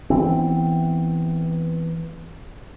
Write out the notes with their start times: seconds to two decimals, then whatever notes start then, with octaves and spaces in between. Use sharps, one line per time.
0.10 E3 B3 C4